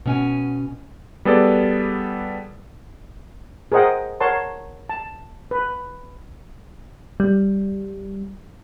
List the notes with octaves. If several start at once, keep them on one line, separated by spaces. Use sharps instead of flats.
B2 C#4 G#5
G3 B3 G#4 A4 B4 D5
G#4 A#4 C5 D#5 F#5 G5
A#4 C#5 F#5 A5 C6
A5
B4
G3